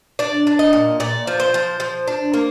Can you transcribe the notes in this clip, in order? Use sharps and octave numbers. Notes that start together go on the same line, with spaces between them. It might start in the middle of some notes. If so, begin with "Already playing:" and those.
D4 D5
D4
D#5
A#2
A#2 D5
F3
C5
F3
F3
D4
A#3